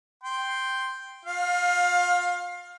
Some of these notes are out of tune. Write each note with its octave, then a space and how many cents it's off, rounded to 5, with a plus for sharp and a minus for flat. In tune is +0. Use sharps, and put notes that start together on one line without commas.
G5 +0 C6 +0
F4 +35 F5 +20